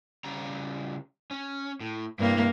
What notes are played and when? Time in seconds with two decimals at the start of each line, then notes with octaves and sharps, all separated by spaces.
0.24 C#3 G3 A#5
1.31 C#4
1.80 A2
2.19 G2 C3 A#3 E4